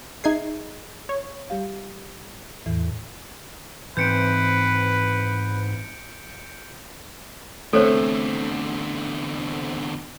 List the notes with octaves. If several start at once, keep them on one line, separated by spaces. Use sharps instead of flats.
D#4 G#4 D#5 E5 G#6 C7
C#5
G3 G4 F5
E2 A2 E3
G#2 E3 C4 B4 C5 G6 C#7 D7
E2 D3 A3 C4 A4 C5 C#5